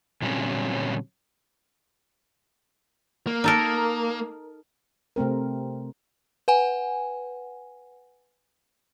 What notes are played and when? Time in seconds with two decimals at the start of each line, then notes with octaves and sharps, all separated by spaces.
0.22 A#2 D3 F#3 G3 C4 C#4
3.27 A#3
3.44 D#4 A4 A#4
5.16 C3 A3 C4 A#4
6.48 B4 F#5 G#5